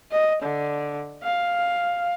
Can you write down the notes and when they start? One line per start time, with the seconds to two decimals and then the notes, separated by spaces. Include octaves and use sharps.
0.12 D#5
0.42 D3
1.24 F5